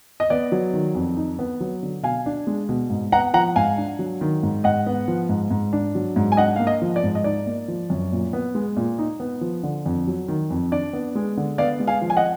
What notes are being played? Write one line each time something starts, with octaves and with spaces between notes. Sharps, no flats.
D#5
B3 D5
F#3
D#3
F2
D#4
B3
F#3
D3
B2 F5 G#5
D4
G#3
B2
G#2
B3 F#5 A#5
F3 F#5 A#5
G#2 F5 G#5
D4
F#3
D#3
G#2
G#2 D#5 F#5
B3
F3
G#2
G#2
D4
F#3
G#2
G#5
D4 D#5 F#5
A#3 F5
D#5
F3
D5
G#2
D#5
D#4 D5
A#3
F3
F#2
A#2
B3
G#3
A#2
D#4
B3
F3
D3
F2
F#3
D#3
F2
D4 D5
B3
G#3
D3
B3 D5 F5
G#3
F5 G#5
F3
G#5
D#5 F#5